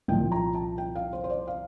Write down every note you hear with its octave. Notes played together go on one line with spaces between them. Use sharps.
C2 A#2 F3 G5
A#5
A5
G5
F5
C5
C5
D5
F5